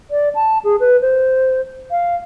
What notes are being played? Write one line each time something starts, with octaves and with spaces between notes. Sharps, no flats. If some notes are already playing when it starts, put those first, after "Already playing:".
D5
A5
G#4
B4
C5
F5